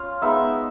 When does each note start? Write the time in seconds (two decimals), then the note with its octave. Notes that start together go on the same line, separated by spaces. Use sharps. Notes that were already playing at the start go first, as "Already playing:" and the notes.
Already playing: C#4 F4 F5
0.21 G#3 B3 D#4 E5